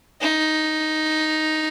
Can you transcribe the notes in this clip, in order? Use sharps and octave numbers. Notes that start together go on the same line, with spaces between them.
D#4